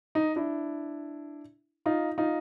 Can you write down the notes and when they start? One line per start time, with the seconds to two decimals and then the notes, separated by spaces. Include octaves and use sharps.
0.15 D#4
0.36 D4 E4
1.86 D#4 F4
2.18 D#4 F4